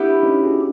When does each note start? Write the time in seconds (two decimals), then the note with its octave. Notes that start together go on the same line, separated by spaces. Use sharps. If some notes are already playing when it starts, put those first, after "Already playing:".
Already playing: B3 C4 D4 E4 G4
0.23 C#4 D#4
0.43 F#4 G#4